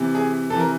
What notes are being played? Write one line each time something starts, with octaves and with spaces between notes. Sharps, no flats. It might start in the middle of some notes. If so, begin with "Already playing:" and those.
Already playing: C3 E3
G#4
C3 E3 A4
A#4